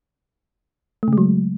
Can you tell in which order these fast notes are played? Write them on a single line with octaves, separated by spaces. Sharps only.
A3 C#3 G#3 F#3